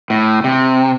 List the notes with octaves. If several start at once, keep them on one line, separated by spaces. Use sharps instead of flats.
A2
C3